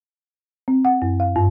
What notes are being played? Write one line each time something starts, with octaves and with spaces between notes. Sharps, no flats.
C4
F#5
F#2
F5
G2